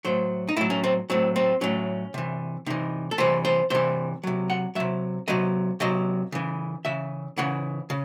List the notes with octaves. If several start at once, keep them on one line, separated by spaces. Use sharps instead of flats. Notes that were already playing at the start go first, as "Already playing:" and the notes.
A2 F#3 C5
D#4
A2 F#3 E4
C#4
C4
A2 F#3 C4
C4
A2 F#3 C#4
C3 E3
C3 E3 D#4
A4
C3 E3 C5
C5
C3 E3 C5
C3 F#3
F#5
C3 F#3 E5
C3 F#3 D#5
C3 F#3 D#5
C#3 E3
C#3 E3 E5
C#3 E3 F#5
C#3